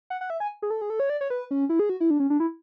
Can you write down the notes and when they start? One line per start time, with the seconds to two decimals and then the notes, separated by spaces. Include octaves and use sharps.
0.10 F#5
0.21 F#5
0.30 E5
0.40 G#5
0.62 G#4
0.70 A4
0.81 G#4
0.90 A4
1.00 C#5
1.10 D5
1.21 C#5
1.30 B4
1.51 C#4
1.69 E4
1.80 G#4
1.89 F#4
2.00 E4
2.10 D4
2.20 C#4
2.30 D4
2.40 E4